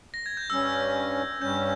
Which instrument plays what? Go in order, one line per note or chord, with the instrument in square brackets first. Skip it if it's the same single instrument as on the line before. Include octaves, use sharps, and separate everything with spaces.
[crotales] A#6
G#6
G6
[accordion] G2 G3 C#4 [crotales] E6
[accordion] G2 G3 C#4 [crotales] G6